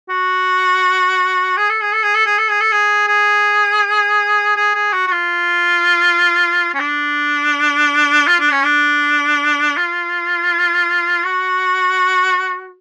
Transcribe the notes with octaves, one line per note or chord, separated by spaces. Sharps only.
F#4
G#4
A4
G#4
A4
G#4
A4
G#4
A4
G#4
A4
G#4
G#4
G#4
G#4
F#4
F#4
F4
C#4
D4
F4
D4
C#4
D4
F4
F#4